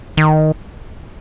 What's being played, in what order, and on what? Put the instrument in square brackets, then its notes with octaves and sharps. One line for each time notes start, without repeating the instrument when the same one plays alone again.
[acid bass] D#3